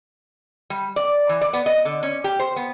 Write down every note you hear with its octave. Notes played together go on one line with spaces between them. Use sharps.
G3
D5
E3
D5
B3
D#5
D3
C#4
G4
C5
B3